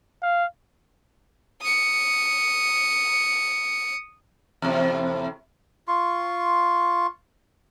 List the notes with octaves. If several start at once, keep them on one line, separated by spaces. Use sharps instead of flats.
F5
D#6 C#7
E2 A2 C3
F4 C6 C#6